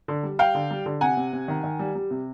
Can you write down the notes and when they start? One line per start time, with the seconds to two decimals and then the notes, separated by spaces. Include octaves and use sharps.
0.08 D3
0.23 G3
0.39 G3 F5 G5
0.55 D3
0.71 G3
0.86 D3
1.01 C3 F#5 G#5
1.17 C3
1.33 C3
1.48 D#3
1.64 D#3
1.79 G3
1.95 G3
2.11 C3